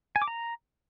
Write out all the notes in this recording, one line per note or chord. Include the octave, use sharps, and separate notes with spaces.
G#5
D6
A#5